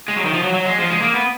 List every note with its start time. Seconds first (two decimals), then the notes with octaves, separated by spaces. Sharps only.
0.08 G#3
0.16 F#3
0.25 D#3
0.34 F3
0.43 F#3
0.54 F#3
0.66 G#3
0.79 F3
0.91 G#3
1.02 A#3
1.14 B3